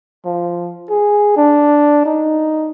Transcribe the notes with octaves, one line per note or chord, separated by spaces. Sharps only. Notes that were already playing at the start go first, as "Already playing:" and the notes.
F3
G#4
D4
D#4